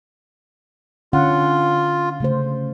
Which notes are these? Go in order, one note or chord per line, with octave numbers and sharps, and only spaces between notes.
D3 C#4 F4 F#5
C#3 A3 C5